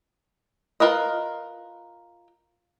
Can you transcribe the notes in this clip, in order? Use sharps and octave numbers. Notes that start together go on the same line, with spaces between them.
F4 A#4 B4 D#5